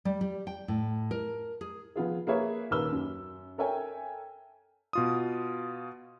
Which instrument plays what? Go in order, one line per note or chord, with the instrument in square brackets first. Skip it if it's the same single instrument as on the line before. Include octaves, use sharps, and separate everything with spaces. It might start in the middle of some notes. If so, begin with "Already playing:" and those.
[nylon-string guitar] G3
G3
G5
A2
A#4
G#4
[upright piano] F3 B3 F4 G#4
A#3 G#4 B4 C#5 E5
D#1 D#2 A#4 B4 E6 G7
F#2
A4 A#4 C#5 E5 G5 G#5
[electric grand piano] B2 F4 D#6